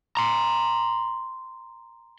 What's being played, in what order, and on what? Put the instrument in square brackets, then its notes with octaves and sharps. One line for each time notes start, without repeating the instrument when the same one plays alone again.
[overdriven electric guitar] A#5 C6